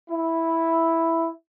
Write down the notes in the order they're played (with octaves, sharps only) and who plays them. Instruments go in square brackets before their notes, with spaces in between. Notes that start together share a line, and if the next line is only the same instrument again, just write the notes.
[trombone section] E4